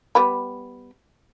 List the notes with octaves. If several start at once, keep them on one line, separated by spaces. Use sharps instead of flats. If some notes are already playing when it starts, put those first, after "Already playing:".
G3 B3 B5